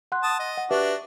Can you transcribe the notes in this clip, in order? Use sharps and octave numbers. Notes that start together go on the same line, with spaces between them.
F#5 C6 F#6
A5 D#6
D#5
F#5
D4 F#4 G4 B4 E5